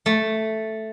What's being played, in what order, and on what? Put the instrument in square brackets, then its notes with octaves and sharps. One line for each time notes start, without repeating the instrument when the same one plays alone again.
[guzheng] A3